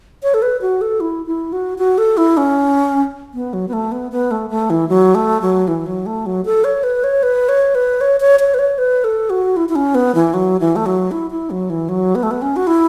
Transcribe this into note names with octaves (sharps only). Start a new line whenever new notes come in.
C#5
A4
B4
F#4
A4
E4
E4
F#4
F#4
A4
E4
C#4
B3
F#3
B3
A3
B3
B3
A3
A3
E3
F#3
A3
F#3
E3
F#3
A3
F#3
A4
C#5
B4
C#5
B4
C#5
B4
C#5
C#5
C#5
B4
C#5
B4
A4
F#4
E4
E4
C#4
B3
E3
F#3
E3
A3
F#3
E4
E4
F#3
E3
F#3
B3
A3
B3
C#4
F#4
E4